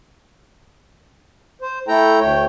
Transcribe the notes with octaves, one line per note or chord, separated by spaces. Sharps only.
C5
A3 E4 A4 G5 A#5
D2 A3 C#5 G5